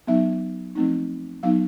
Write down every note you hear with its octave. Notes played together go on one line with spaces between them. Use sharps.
F#3 B3 D#4 E5
F3 A3 C4 D#4
F#3 B3 D#4 F5